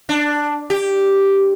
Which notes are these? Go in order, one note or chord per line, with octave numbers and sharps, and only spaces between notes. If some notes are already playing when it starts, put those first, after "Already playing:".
D4
G4